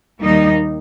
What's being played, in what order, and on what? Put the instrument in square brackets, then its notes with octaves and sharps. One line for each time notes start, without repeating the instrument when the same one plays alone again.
[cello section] D#2 D#3 G3 A#3 D#4